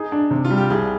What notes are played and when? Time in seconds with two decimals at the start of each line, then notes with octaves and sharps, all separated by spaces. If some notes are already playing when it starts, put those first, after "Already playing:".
Already playing: D#4 G#4
0.12 D4
0.31 C3
0.45 F4
0.51 G3
0.58 G4
0.70 C2 G#4